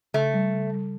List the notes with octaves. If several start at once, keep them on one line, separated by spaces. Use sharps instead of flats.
C#3 A3
G3
C#3
G3